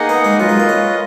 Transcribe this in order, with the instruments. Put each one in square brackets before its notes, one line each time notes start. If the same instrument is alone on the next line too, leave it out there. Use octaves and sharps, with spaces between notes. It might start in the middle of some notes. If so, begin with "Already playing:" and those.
Already playing: [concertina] A#3 D#4 G#4 D#5 F#5
[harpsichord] B3
G#3
[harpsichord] F#3 [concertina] F4 B4 D#5
[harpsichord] G#3
A#3
C#4